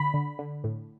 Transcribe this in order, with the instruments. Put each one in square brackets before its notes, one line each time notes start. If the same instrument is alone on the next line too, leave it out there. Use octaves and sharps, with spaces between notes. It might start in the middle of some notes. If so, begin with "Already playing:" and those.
Already playing: [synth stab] D3 B5
D3
D3
A2